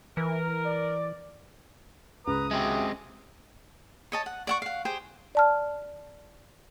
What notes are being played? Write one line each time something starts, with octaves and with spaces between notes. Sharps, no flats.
E3 A#4
D5
C#2 B4 A#5 D#6
G#3 C4 F#4 G4 E5
C#5 D#5 A5
F#5
D5 F#5 C#6
F5 F#5
G4 G#4 C5 G5
D5 A5 F6